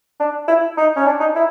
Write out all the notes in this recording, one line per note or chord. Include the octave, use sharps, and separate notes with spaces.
D4
E4
D#4
C#4
D4
D#4
E4